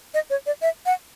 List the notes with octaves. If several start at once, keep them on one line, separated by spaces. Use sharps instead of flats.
D#5
C#5
D5
E5
F#5